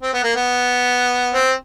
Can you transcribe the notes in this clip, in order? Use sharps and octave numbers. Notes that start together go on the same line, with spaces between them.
C4
B3
A#3
B3
C4